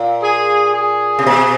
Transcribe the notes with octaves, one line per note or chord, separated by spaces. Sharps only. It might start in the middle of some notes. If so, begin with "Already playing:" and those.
Already playing: A#2
G#4
G#4
C3
B2